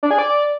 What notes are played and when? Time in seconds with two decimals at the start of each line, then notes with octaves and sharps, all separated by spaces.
0.03 D4
0.11 G#4
0.18 D5